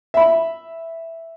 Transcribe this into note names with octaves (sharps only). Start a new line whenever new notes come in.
E5 B5